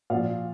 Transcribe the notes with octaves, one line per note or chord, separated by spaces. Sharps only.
A#2 F3 D5 F5